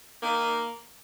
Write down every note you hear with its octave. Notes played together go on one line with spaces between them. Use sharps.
D#3 A#3
D#3